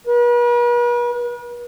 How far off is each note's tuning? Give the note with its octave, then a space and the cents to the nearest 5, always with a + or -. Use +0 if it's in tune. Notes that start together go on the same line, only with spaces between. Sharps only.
B4 -45